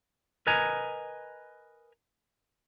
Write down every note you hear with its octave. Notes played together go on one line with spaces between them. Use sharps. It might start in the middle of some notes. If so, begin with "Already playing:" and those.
A#4 B4 D#5 G#5 A#5